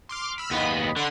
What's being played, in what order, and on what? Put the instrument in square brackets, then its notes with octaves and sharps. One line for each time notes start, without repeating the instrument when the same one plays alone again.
[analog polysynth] C6 D6 F6
B5 E6 F6
[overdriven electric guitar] D#2 B3 [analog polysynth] D#5 B5
[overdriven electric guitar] D3 [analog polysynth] F#5 B5 C6